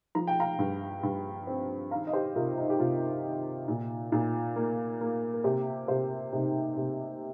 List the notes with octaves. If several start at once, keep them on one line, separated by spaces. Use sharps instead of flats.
F3 A#5
G5
F5 A#5
G2
G2
C4
D#3 F5 A#5
D#5
G4 C5
C3 F4 A#4
D#4
G4
C3 F4
D#3
A#2
A#2
A#3
A#3
A#4
C3 G4 C5
C3 G4 C5
C3 D#4
C3